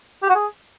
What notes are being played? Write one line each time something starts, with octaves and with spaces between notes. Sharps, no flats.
G4
F#4
G#4